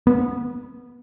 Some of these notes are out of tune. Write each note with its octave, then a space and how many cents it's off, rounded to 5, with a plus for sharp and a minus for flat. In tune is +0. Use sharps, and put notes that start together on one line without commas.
B3 -15